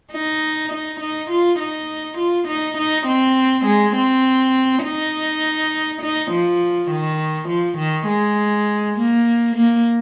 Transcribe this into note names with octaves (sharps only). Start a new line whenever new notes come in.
D#4
D#4
D#4
F4
D#4
F4
D#4
D#4
C4
G#3
C4
D#4
D#4
F3
D#3
F3
D#3
G#3
A#3
A#3